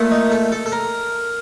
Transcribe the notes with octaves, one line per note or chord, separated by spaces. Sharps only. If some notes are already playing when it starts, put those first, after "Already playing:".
Already playing: A#2 A3
D#4
A4
A4
A4
A#4